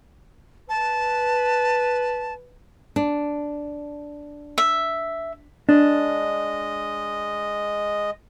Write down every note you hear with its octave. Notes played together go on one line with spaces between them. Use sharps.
B4 A5
D4
E5
G#3 D4 D#5